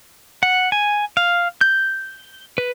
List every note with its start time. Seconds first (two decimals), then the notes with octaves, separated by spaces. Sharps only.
0.43 F#5
0.72 G#5
1.17 F5
1.61 G6
2.58 B4